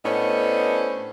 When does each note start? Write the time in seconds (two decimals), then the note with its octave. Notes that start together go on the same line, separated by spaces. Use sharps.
0.05 A2 B3 C#4 D4 C5 D#5